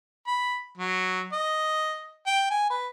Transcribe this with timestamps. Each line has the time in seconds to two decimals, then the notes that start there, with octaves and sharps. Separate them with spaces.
0.27 B5
0.78 F#3
1.33 D#5
2.26 G5
2.51 G#5
2.70 B4